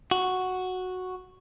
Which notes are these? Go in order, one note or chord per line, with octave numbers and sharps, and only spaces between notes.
F#4